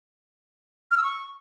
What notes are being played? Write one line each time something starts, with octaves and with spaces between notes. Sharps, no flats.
F6
E6
C#6